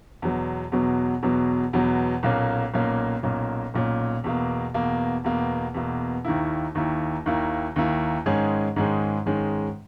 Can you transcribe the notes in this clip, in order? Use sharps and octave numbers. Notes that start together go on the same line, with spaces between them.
E2 B2 F#3
E2 B2 F#3
E2 B2 F#3
E2 B2 F#3
B1 A#2 A#3 C#4
B1 A#2 A#3 C#4
B1 A#2 A#3 C#4
B1 A#2 A#3 C#4
E2 B2 A#3
E2 B2 A#3
E2 B2 A#3
E2 B2 A#3
D#2 D#3 A#3 E4
D#2 D#3 A#3 E4
D#2 D#3 A#3 E4
D#2 D#3 A#3 E4
G#2 D#3 G#3 C#4 G#4
G#2 D#3 G#3 C#4 G#4
G#2 D#3 G#3 C#4 G#4